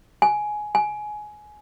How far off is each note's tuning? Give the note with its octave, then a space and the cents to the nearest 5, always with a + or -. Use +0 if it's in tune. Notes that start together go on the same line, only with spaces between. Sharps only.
G#5 +15
G#5 +20